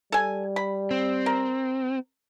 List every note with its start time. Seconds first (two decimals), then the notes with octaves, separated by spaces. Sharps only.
0.12 G3 A4 G#5
0.56 B5
0.91 C4
1.26 A#4